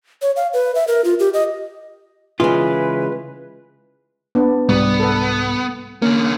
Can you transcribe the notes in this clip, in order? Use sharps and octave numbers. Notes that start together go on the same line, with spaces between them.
C#5
F5
B4
E5
A#4
F4
G4
D#5
C#3 E3 G#3 F4 G#4 B4
B3 D4
C2 G#2 G3 B3
A4 B4
D3 A#3 C#4